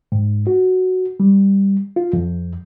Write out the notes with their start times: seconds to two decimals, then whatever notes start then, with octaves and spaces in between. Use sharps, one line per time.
0.12 G#2
0.47 F#4
1.20 G3
1.96 F4
2.13 F2